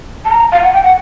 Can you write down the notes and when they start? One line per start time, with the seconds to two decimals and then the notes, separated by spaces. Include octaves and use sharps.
0.25 A5
0.31 A#5
0.52 F5
0.63 F#5
0.73 G5
0.83 F#5